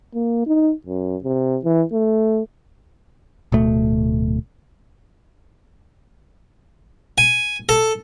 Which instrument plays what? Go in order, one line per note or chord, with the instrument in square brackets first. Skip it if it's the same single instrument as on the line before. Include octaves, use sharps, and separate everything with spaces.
[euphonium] A#3
D#4
F#2
C3
E3
A3
[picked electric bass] D1 B2 A3
[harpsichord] G#5
A4